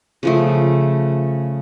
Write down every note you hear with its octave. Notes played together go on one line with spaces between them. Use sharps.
C#3 F3 A3